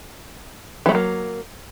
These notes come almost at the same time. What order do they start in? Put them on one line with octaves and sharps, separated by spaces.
E3 A3 F#3 A#3